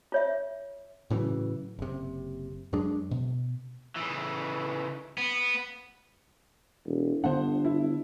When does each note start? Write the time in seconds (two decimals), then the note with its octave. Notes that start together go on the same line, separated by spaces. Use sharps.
0.12 F4 C#5 E5
1.10 A2 C#3 E3 F#3
1.79 F#1 C3
2.73 F#2 F#3 G#3 D4
3.11 B2
3.96 C#3 E3
5.18 B3
6.85 E1
7.24 G1 D3 B3 D4 C5 F#5
7.65 E4